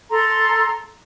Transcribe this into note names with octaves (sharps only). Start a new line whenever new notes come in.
A4 A#5 C6